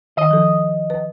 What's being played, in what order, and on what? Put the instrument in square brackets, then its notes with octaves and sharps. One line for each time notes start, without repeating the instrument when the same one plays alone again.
[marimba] D#3 [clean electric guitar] D#5
[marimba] F3 A4
B4